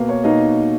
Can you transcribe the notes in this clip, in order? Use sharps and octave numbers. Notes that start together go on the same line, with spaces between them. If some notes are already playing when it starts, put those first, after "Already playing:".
Already playing: B2 A#3 B4
C#5
B2 A#3 D#4 D#5